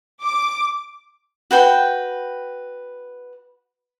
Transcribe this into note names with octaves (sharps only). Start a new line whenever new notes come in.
D6
F#4 B4 G5